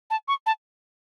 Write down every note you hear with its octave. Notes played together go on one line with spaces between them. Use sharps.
A5
C#6
A5